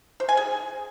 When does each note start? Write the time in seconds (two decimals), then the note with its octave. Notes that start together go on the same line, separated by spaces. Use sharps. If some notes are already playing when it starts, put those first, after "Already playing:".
0.20 C5
0.29 G#5
0.37 G#4